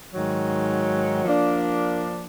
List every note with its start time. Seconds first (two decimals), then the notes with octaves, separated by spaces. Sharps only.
0.13 G#2 D#3 F#3
1.25 F3 A#3 D4